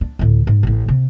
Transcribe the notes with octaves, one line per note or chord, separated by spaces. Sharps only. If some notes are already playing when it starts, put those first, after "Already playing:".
D4
D2 A2
G#2
A1 A2
C3